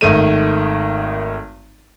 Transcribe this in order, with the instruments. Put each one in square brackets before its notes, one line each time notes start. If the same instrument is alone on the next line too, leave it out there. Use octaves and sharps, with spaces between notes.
[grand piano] G#1 D#3 A3 D#7